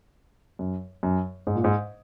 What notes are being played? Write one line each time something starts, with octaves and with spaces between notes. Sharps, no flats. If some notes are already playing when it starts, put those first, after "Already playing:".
F#2
F#2
G#2
A#2
G#2